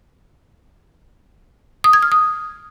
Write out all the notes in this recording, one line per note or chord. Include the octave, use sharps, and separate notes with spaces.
D#6
G#6
F6
D#6